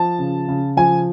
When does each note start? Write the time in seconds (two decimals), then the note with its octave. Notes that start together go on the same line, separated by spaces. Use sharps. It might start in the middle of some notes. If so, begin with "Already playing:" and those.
Already playing: F3 A5
0.19 C#3
0.48 C#3
0.77 F3 G#5